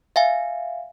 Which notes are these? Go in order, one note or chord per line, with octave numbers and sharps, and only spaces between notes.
E5 F5 G#5